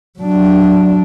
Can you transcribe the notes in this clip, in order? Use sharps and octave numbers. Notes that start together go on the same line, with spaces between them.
F#3 D4